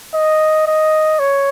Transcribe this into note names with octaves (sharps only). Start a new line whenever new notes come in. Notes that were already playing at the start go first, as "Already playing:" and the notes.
D#5
D#5
C#5